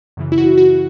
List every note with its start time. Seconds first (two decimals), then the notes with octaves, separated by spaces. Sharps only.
0.17 F#2 C#3 E3
0.32 E4
0.38 F#4
0.58 F#4